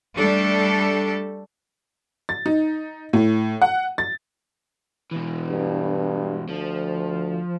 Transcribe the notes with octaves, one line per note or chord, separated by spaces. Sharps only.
G3 A3 D4 A4
A6
D#4
A2
F#5
A6
B2 E3
G2
D2 F3